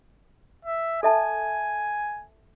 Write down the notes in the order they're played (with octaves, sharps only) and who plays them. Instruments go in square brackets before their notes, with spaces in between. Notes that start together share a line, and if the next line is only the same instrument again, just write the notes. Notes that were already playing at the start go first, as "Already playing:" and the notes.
[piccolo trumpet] E5
[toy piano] A4 E5 A5 [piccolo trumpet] G#5